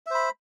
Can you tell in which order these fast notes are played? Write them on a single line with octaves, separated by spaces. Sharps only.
E5 C5 B5